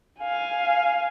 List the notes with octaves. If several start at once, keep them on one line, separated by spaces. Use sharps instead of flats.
F5 G#5